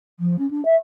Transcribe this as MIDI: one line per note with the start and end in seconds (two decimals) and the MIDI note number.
0.19 0.36 53
0.38 0.49 61
0.50 0.63 62
0.65 0.75 76